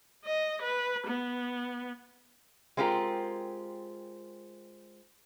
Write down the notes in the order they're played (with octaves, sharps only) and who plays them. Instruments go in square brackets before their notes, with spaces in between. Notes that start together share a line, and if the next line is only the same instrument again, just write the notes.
[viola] D#5
B4
B3
[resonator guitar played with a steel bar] G#3 C4 F4 G4 A#4